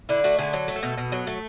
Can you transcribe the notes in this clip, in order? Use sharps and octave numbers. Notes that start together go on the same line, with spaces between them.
D3 E4
A3 F#4
D3 G#4
F#3 A4
A3
A4
B2
B2
F#3
A3